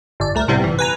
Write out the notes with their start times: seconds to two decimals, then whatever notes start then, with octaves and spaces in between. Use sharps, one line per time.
0.20 G1 D5
0.35 C2 A3 A#4
0.48 A2 C3 G3 B3 C4
0.64 G1 E3
0.79 B4 G#5 A#5